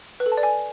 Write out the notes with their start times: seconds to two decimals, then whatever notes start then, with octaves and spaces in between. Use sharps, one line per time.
0.20 B4
0.26 A4
0.32 A5
0.37 D5
0.43 G#5